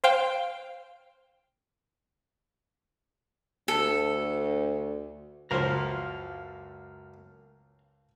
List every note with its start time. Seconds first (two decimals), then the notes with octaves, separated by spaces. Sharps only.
0.04 C5 F5 G5
3.68 D2 A4
5.51 C#2 F#2 F3 C5 F5 A#5